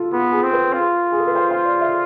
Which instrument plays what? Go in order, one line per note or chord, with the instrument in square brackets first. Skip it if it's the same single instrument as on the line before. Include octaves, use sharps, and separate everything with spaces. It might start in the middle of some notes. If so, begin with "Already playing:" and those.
Already playing: [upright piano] F4 A4
[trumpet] B3 [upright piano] F4
[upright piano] G#4
[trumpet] C4
[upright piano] B4
[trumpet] F4
[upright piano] G#4
A4
B4
C5
C5
D5
E5